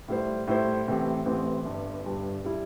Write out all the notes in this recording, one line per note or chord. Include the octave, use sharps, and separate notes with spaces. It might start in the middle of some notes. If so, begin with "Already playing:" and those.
A2 G3 E4 C5
A2 G3 E4 C5
A1 A2 E3 C4 G4
A1 A2 E3 C4 G4
G1 G2 G3
G1 G2 G3
G3 E4